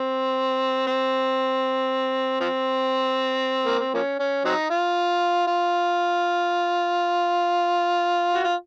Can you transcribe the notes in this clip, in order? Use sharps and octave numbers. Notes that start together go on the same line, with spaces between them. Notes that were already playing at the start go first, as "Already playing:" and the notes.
Already playing: C4
C4
F3 C4
A#3
C4
F3 A#3 C#4
C#4
F#3 C4 D#4
F4
F4
F#4
F4